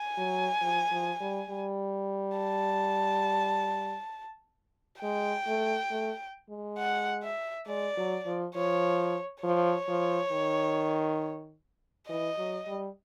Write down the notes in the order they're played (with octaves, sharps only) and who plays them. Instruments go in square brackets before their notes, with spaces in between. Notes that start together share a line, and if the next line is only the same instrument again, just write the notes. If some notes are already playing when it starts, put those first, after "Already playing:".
Already playing: [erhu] G#5
[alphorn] F#3
F3
F3
G3
G3
[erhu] A5
[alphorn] G#3 [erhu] G5
[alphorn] A3
A3
G#3
[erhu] F#5
E5
[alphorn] G#3 [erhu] D5
[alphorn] F#3
F3
[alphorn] F3 [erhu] C#5
[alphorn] F3 [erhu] C#5
[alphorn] F3
D#3
[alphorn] E3 [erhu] D#5
[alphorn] F#3
G3